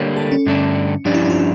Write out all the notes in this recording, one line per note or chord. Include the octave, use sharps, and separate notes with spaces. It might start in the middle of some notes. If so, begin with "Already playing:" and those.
Already playing: D3 G3 A#3 C#5
A4
C#4
G2 D3 A3 D4
G2 F3 C#4 D4 G4 D5
E4
D4
F4
E4